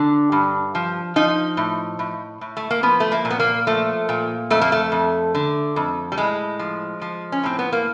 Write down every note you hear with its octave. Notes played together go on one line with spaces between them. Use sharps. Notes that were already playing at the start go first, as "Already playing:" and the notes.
Already playing: D3 D4
G2
F3
F3 D#4
A2
A2
A2
A3
A#3
F3 B3
A3
A#3
A#2
B3
A#3
F3 A3
A#2
F2 A3
A#3
A3
F2
D3
F2
G3
A2 G#3
F3
F3
C#4
A2 C4
B3
A#3